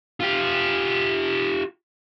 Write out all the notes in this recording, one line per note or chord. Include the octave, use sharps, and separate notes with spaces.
F4 G4